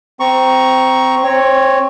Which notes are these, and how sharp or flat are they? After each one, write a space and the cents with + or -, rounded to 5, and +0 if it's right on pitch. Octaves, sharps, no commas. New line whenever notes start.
C4 -10 A#5 +10 C#6 +0
C4 +20 C#5 +0